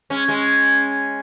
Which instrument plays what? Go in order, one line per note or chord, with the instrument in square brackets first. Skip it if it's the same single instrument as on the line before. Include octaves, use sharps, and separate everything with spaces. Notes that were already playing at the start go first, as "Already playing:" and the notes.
[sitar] G#3 C#4
G#3 C#4